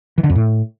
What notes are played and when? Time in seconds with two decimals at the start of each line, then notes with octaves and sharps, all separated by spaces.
0.18 E3
0.24 D3
0.30 F2
0.35 A2